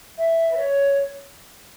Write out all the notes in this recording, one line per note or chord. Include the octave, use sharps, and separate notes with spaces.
E5
B4
C#5